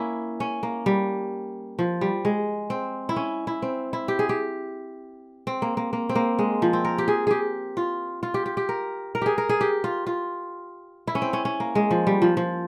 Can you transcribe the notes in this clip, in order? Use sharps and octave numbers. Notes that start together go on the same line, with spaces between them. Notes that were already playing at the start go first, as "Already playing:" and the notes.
Already playing: A#3 C#4 E4
C#4
A#3
G3
F3
G3
G#3
C4
E4
C#4
E4
C4
E4
G4
G#4
G4
C4
A#3
A#3
A#3
C4
A#3
G#3
F3
C4
A#4
G4
G#4
G4 G#4
F4
F4
G4
G4
G4
A#4
A#4
G4 G#4
A#4
G#4
G4
F4
F4
E4
C#4
C4
C#4
C#4
A#3
G#3
F3
G3
F3
F3